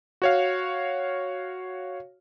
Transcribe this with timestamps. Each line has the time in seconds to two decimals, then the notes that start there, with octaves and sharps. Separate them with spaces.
0.22 F#4 C#5 F5